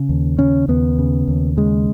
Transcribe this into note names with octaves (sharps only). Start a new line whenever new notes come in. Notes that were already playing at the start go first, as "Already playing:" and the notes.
Already playing: C#3
D#2
C#3 C#4
D#2 B3
C#3
D#2
C#3 G#3